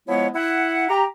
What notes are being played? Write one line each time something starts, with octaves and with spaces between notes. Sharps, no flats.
F3 G#3 B3 E4 C#5
E4 F#5
G4 A#5